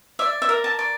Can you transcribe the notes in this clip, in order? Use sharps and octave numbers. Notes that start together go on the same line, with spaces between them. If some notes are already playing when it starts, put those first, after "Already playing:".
D5 E5
E5
A#4
A5
D5